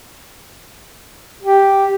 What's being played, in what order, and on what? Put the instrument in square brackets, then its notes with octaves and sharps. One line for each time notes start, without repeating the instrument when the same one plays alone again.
[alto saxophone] G4